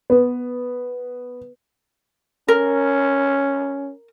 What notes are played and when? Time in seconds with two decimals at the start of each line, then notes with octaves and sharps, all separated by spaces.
0.10 B3
2.48 C#4 A#4